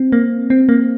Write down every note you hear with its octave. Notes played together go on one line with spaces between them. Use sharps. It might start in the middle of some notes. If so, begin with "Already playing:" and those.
Already playing: C4
A#3
C4
A#3